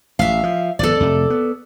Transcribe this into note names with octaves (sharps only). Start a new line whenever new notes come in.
A1 E5 F5
F3
G#1 B2 B3 A4 D5
F2 C3 A3
B3